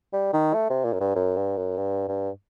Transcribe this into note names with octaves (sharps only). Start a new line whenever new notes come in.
G3
D#3
A3
C3
A#2
F#2
G2
F#2
G2
F#2
G2
G2